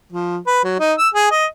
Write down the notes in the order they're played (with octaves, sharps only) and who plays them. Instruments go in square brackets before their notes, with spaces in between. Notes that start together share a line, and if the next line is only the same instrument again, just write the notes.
[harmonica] F3
B4
F#3
D#4
E6
G#4
D#5